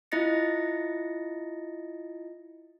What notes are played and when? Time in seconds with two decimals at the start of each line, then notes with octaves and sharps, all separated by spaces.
0.12 E4 F4 D#5 A6 A#6 C#7